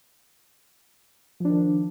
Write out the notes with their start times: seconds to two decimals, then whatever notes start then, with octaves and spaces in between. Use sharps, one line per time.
1.40 F3
1.45 D4
1.49 D#3